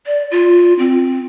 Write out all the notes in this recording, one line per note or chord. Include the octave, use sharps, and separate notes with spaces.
D5
F4
C4